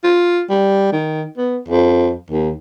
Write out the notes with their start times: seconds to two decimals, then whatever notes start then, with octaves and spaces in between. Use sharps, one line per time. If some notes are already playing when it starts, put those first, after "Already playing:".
0.04 F4
0.50 G3
0.92 D#3
1.37 B3
1.68 F2
2.30 D#2